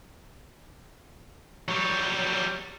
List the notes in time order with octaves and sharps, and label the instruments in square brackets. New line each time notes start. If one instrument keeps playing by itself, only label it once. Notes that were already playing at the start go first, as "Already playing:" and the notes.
[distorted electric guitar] F#3 G3